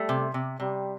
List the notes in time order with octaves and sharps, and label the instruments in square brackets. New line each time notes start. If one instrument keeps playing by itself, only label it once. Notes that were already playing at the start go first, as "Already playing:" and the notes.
Already playing: [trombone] G3 [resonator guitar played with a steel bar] A3
[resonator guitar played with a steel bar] C3
C3
[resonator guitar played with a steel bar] C3 [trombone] G3